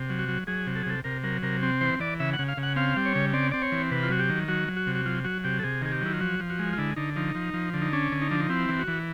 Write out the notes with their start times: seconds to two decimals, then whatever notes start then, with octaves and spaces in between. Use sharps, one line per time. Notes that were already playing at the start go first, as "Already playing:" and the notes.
Already playing: C3
0.10 F#3
0.19 F#4
0.28 F#3
0.47 F#3 G#4
0.67 C3
0.76 A4
0.83 G#4
0.86 C3 A4
1.04 C3 A#4
1.23 F#3 A#4
1.42 C3 A#4
1.63 C4
1.81 E3 C5
2.00 E3 D5
2.20 C#3 E5
2.33 F#5
2.39 C#3
2.48 F5
2.57 C#3
2.63 F#5
2.76 C4 F5
2.96 G3
3.06 C#5
3.15 C#3
3.33 C4 D5
3.51 C4 D5
3.62 C#5
3.72 E3
3.91 C3 B4
4.03 F4
4.10 F#3 F#4
4.19 G4
4.29 D#3
4.48 F#3 F#4
4.68 F#3
4.77 F#4
4.87 C3
4.95 F#4
5.06 F#3 F4
5.24 F#3 F#4
5.44 C3 G4
5.59 A4
5.63 C3 G#4
5.82 D#3 G#4
5.92 G4
6.01 F#3 E4
6.13 F4
6.21 F3 F#4
6.39 F3
6.50 F#4
6.59 G#3
6.73 F4
6.78 D3 E4
6.96 D3 D#4
7.16 F3 D#4
7.35 F3
7.54 F3
7.74 D3
7.81 D#4
7.93 C#4 D4
8.12 D3
8.21 D#4
8.31 F3 D4
8.40 D#4
8.49 C4 E4
8.69 E3
8.79 F#4
8.88 E3